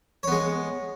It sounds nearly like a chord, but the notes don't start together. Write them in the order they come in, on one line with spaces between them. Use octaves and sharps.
C#5 B3 G#3